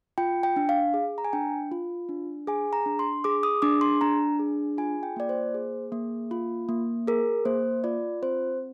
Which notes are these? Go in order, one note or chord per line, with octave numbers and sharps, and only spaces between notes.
F4 G5
G5
D4
F5
G#4
A#5
G#5
D4 G5
F4
D4
G#4 G#5
A#5
D4
C6
G#4 D6
D#6
D4 D6
C6
D4 A#5
G#4
F4 G#5
G5
A#3 D5
C5
G#4
A#3
F4
A#3
G#4 A#4
A#3 C5
F4 D5
C4 C5